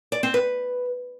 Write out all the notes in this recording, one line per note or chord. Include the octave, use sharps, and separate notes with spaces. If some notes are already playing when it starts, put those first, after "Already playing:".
D5
C4
B4